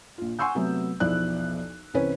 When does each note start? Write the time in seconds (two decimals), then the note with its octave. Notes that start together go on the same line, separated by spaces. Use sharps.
0.18 A#1 F4
0.39 F#5 G#5 C6 C#6 E6 G6
0.55 C3 F#3 A3 B3
1.00 B1 E2 F3 E4 D5 F#6
1.94 C2 C3 E3 C4 C#4 B4